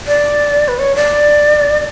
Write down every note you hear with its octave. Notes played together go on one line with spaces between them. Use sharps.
D5
B4
C#5
D5